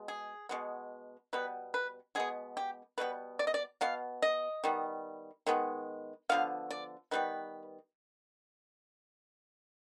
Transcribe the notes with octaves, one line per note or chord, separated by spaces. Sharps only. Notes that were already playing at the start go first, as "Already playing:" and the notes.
Already playing: B2 G#3
G#4
B2 G#3 B3
B2 G3 B3 B4
B4
B2 G#3 B3 G#4
G4
B2 G3 B3 B4
D5
D#5
D5
B2 B3 F5
D#5
D#3 G3 B3
D#3 G#3 B3
D3 F3 B3 F5
D5
D#3 G3 B3 B4